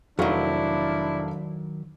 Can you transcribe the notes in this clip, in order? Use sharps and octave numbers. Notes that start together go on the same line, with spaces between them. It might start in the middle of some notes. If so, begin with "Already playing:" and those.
F1 D#3 F#3 D4 E4 F5